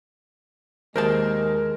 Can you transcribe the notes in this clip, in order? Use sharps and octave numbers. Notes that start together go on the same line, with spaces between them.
D#2 G#3 A#4 C5 A5